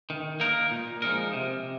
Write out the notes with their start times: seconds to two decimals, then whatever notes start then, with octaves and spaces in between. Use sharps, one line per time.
0.10 D#3
0.40 A#3 D#4 A#4
0.71 A#2
1.02 F3 G#3 D#4 A#4
1.33 C3